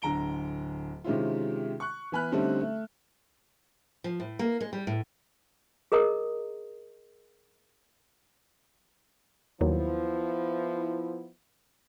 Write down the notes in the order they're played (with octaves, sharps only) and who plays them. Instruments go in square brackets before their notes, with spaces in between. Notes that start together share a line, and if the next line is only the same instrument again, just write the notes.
[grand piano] D1 D3 A#5 D7 G7
C3 D#3 G#3 C#4 E4 F4
C#6 F#6
E3 B3 G#5 B5 F6 F#6
D3 G3 A3 C4 C#4 D#4
A3
[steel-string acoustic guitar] F3
A2
A#3
G#3
G3
A2
[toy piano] G#4 A#4 D#5 A#5 D#6
[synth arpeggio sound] D#2 D#3 F#3 [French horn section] F3 B3 E4